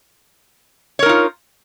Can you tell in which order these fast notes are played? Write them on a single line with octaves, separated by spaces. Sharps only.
C#5 A#4 D#4 F4